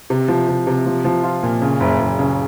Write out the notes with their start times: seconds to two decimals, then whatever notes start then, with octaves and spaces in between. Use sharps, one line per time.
0.10 C3
0.28 F3
0.48 C3
0.67 C3
0.86 F3
1.04 F3
1.23 F4
1.43 A#2
1.62 C#3
1.80 F#1
1.99 F#1
2.19 C#3